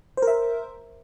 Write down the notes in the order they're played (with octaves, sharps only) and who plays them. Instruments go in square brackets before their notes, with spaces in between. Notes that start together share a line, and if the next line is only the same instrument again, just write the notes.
[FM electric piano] C5
A#4
E5